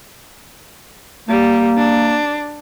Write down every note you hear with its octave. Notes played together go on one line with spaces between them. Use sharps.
G3 A#3
D4